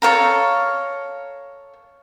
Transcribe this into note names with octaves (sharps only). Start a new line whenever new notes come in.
A4 C#5 F5 A#5